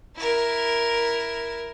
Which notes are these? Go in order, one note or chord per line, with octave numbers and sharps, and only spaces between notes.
E4 A#4